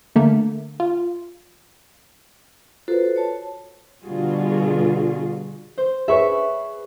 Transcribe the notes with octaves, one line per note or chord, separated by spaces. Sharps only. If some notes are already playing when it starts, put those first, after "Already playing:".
D3 A3 A#3
F4
F4 F#4 A4 B4 C5
C#5 A5
B2 D3 G3 F4 F#4 G#4
C5
G#4 B4 C#5 E5 B5 C#6